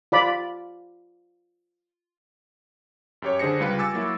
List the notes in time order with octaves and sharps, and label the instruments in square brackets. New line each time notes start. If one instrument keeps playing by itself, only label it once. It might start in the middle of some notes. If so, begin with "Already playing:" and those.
[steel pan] F4 D5 B5
[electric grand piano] F#2 G4 C#5
D3 D4 G#4 C5 A#6 C#7
C#2 G3 F4 B4 C#7
G#5 D6 E6 A6
F#3 A#3 E4 F#4